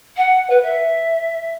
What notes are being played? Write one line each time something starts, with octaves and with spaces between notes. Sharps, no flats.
F#5
B4
E5